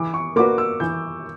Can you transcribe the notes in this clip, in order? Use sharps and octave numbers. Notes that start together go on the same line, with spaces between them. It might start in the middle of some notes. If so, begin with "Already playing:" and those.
Already playing: E3 D6
C#6
A#3 D4 F#4 B4 D6
E6
E3 G6